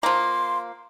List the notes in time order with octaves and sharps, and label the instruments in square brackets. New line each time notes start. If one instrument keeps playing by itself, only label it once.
[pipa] F3 A#3 [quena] C6